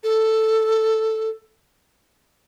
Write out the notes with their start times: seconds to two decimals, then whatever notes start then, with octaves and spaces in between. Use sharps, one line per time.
0.03 A4